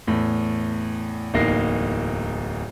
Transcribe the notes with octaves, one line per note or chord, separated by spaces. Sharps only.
E2 A2
D1 E2 A#3 D#4 A#6 C7